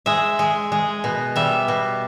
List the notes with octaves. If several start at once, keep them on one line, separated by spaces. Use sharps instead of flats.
G#3 E5
G#3
G#3
B2
G3 E5
B2